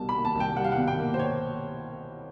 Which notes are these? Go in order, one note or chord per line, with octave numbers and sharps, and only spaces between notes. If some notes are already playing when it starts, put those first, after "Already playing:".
Already playing: C2 B2 G3 A5
B5
A#3
A5
C2
G5
G3 F#5
F5
F#5
B2
G5
A#3
C5
C#5